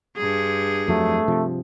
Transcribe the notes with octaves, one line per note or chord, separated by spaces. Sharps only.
G2 G#4
F2 F#3 A3
C3 F3